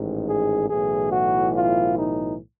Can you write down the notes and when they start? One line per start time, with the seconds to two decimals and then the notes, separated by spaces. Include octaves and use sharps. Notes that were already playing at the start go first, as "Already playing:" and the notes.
Already playing: A1 G#2 D#3
0.28 G#4
0.69 B1 A2 E3 G#4
1.11 F#4
1.54 F4
1.97 D#4